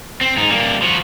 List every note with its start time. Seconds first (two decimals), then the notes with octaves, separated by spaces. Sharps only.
0.21 C4
0.37 G#2 D#4
0.50 G3 A#3
0.82 F3 F#4